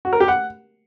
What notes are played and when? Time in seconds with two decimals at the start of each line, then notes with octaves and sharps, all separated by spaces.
0.05 F#4
0.13 A#4
0.20 G4
0.28 F#5